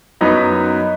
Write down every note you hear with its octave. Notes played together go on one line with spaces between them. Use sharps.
F#2 F#3 B3 D#4 B4